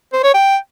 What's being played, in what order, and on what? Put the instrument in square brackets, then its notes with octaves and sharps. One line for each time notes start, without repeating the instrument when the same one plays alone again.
[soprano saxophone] C5
C#5
G5